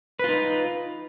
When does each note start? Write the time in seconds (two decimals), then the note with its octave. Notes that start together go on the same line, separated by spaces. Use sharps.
0.19 B4
0.24 F4
0.28 D#4